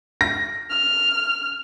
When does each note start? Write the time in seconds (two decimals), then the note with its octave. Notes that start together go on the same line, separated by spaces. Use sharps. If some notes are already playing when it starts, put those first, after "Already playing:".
0.21 A#6
0.71 F6